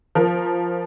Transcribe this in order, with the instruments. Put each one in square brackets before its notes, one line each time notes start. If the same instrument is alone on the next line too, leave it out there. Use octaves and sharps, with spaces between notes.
[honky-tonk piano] F3 A#4